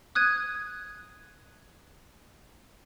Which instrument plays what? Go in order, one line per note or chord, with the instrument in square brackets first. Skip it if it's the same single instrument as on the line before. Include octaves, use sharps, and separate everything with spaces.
[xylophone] D#6 F#6 G#6 D#7